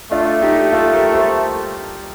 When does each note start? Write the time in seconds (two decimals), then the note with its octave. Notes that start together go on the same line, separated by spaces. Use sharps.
0.12 A3 D4 F4
0.42 D#4 G4
0.73 F4 A4
0.93 G4 A#4
1.14 A4 C5